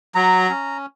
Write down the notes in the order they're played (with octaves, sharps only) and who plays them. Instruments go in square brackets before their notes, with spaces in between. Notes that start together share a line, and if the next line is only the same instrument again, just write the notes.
[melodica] F#3 A#5
C#4